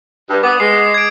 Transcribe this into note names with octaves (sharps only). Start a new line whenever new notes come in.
G2
B3 D6 D#6
G#3 C7
G#6 D7